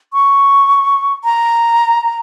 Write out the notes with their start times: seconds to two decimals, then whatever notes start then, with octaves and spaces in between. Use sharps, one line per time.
0.13 C#6
1.24 A#5